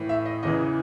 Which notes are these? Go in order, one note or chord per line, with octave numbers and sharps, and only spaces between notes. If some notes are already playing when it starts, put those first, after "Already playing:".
Already playing: A2 E3
E5
D#5
E2 C#3 E3 D#5